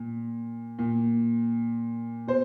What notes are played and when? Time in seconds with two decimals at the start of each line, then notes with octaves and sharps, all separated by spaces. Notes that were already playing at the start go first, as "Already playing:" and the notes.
Already playing: A#2
0.79 A#2
2.27 B2 C5